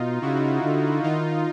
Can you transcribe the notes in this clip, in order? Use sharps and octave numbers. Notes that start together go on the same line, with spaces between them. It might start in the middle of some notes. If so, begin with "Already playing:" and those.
Already playing: B2 D#4 F4
C#3 E4 F#4
D3
D#3 D#4 F4